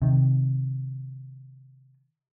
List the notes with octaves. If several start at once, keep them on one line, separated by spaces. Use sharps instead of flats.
C3 D#3